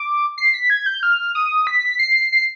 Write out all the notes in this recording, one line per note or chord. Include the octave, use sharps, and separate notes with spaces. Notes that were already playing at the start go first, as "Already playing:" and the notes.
Already playing: D6
C7
B6
G#6
G6
F6
D#6
B6
C7
C7